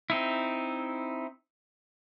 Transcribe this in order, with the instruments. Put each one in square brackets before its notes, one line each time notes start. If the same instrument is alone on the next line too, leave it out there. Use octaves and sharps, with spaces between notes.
[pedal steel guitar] C4 D#4 E4